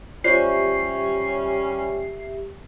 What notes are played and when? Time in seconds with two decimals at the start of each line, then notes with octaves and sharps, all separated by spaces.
0.24 G3 C#4 F4 G4 C5 D5 E5 C7